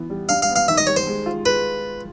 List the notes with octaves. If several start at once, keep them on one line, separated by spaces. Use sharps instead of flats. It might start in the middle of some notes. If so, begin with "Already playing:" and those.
Already playing: E3 B3
G3
D4 F5
F5
B3
F5
D#3 E5
D#5
G3 C#5
C5
G#3
F4
G#3 B4